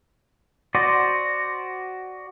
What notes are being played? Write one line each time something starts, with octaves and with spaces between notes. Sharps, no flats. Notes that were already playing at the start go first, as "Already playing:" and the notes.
F#4 C5 D5 D#5